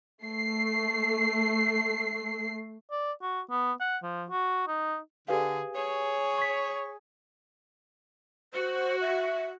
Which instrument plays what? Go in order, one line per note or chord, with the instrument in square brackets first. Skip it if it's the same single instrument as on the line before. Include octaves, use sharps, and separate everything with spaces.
[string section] A3 C7
[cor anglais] D5
F#4
B3
F#5
F3
F#4
D#4
[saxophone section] D3 [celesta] G4 B4 F5 [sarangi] G#4
[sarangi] G#4 [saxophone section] C#5
[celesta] C#6 B6
[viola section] F#4 [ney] C5
[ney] E5